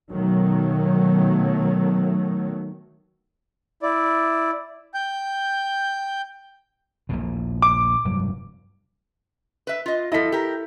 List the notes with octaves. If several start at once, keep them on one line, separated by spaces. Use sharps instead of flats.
B2 D#3 F#3 A3
E4 D5
G5 G6
A#1 D#2 A2
D6
F1 G2 F#3
B4 E5
F4 D#5
F3 E4 A4 D#5 B6
G4 A#4